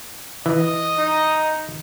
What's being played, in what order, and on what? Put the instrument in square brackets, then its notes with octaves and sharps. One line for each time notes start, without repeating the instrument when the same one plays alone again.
[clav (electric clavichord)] E3 [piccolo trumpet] D#5
[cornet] D#4